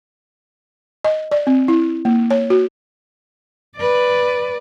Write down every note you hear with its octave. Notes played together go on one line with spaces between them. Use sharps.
D#5
D5
C4
E4
A#3
C#5
F#4
B4 D5